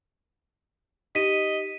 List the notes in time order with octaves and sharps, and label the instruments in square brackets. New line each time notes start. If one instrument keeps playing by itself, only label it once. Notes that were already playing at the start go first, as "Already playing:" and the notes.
[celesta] D#4 G4 [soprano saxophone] D#5 [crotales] B6 D#7